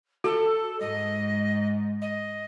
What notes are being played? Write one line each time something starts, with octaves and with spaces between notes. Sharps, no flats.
F#4 A4
G#2 D#5
D#5